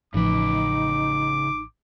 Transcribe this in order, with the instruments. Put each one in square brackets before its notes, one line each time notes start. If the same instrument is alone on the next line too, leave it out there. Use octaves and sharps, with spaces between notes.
[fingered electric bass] A1 A2 F3 [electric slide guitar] C#3 B4 [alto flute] D#4 [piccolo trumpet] D6